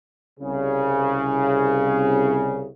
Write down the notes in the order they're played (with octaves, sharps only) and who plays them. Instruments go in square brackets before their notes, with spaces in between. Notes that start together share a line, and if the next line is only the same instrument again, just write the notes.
[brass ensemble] C2 C#3